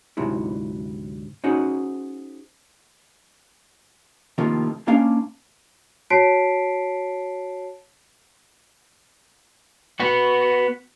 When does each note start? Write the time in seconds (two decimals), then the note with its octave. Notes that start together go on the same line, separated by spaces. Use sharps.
0.17 D2 G#2 C3 F#3 E4
1.44 C#4 D#4 F#4 G#4 C5 F#5
4.38 A2 C3 D#3 F3 A#3
4.87 G#2 A#3 C#4 D4 F5
6.10 F#4 C#5 A5 B6 C7 D7
10.00 B3 F#4